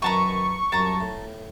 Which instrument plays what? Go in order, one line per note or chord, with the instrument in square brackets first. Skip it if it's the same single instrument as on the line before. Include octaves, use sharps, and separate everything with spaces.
[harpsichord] F#2 D#3 [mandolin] B4 A5 A#5 [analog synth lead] C#6
[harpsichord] C2 F#2 [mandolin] A5 A#5
[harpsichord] A2